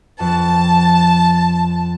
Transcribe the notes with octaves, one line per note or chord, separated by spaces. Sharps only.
F2 A5